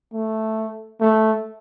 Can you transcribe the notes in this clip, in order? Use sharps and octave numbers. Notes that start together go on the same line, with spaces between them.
A3
A3